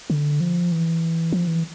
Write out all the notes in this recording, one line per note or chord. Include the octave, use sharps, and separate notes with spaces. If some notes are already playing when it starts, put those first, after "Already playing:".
D3
F3
E3
F3
E3